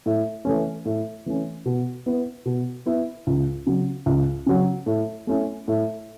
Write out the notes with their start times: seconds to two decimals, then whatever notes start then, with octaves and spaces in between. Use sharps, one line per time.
0.06 A2
0.45 E3 A3 C#4
0.85 A2
1.26 E3 A3 C#4
1.66 B2
2.06 B3 E4
2.45 B2
2.86 B3 E4
3.27 C#2
3.67 C#3 F#3
4.06 C#2
4.46 C#3 F#3
4.86 A2
5.27 A3 C#4 E4
5.68 A2